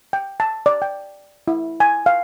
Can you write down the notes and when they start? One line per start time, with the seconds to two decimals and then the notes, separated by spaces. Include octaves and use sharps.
0.13 G5
0.40 A5
0.66 D5
0.82 G5
1.48 E4
1.80 G#5
2.06 F5